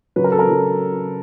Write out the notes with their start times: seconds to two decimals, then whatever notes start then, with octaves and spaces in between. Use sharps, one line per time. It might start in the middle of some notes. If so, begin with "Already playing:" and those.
0.16 C#3 F#3 B4
0.24 A#4
0.32 A4
0.39 A#4
0.47 C#3 F#3